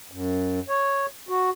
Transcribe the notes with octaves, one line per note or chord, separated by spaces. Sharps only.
F#2
C#5
F#4